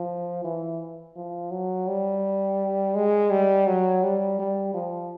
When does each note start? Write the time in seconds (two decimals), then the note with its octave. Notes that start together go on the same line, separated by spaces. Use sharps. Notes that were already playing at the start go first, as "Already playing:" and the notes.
Already playing: F3
0.44 E3
1.16 F3
1.51 F#3
1.88 G3
2.95 G#3
3.31 G3
3.67 F#3
4.03 G3
4.39 G3
4.74 F3